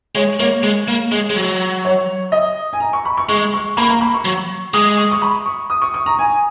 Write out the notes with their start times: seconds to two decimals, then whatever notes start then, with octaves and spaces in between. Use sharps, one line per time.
0.15 G#3 C#5
0.40 A#3 C#5
0.63 G#3
0.88 A#3
1.12 G#3
1.30 G#3
1.36 F#3
1.85 C#5
2.32 D#5
2.73 G#5
2.80 A#5
2.93 C#6
3.05 B5
3.17 C#6
3.29 G#3 C#6
3.54 C#6
3.77 A#3 B5
3.89 A#5
4.01 B5
4.14 C#6
4.25 F#3
4.74 G#3 D#6
4.97 C#6
5.12 C#6
5.22 B5
5.46 C#6
5.70 D#6
5.82 C#6
5.94 C#6
6.06 A#5
6.19 G#5